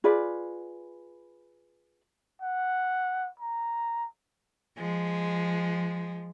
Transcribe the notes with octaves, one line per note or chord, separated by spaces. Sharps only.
F4 G#4 B4 D5
F#5
A#5
F3 G#3